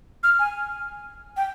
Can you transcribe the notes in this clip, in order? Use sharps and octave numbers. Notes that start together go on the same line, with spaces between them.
F6
G#5
G5